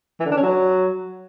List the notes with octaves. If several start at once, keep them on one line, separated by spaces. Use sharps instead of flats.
E3
D3
D4
C#4
F#3